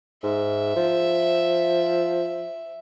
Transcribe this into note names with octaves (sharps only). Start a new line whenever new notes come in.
G#2 E5
F3